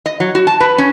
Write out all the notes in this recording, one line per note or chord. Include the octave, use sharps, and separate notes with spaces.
D#5
F#3
F#4
A5
B4
C#4